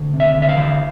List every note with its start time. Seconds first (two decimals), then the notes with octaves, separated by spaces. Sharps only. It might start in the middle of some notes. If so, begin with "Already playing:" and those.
Already playing: D2
0.13 C3
0.20 E5
0.35 D2
0.42 E5
0.49 F5
0.56 E3